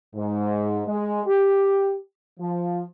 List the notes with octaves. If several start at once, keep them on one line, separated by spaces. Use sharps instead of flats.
G#2
G#3
G4
F3